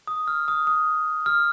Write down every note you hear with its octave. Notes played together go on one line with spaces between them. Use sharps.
D#6
F6
D#6
D#6
F6